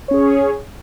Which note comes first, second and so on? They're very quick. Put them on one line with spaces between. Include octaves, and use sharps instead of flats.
C#5 C#4 G#4